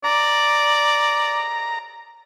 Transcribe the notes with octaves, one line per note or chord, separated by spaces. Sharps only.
D5 A#5